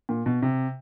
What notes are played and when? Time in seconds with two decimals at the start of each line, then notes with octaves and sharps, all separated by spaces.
0.09 A#2
0.26 B2
0.42 C3